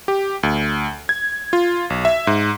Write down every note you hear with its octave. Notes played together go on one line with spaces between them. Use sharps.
G4
D2
G#6
F4
B1
E5
G#2